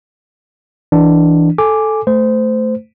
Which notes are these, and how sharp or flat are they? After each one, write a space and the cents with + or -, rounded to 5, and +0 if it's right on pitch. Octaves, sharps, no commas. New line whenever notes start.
E3 +0 D4 +0
A4 -5 G#5 +0 D6 +0
A3 +0 C5 -20